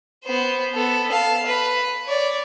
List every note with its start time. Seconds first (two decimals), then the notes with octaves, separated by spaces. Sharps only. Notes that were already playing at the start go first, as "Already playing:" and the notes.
0.24 B3 C5
0.74 B3 A4
1.11 F5 A5
1.46 B4
2.05 C#5 D5